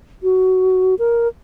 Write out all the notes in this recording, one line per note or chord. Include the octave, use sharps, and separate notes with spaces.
F#4
A#4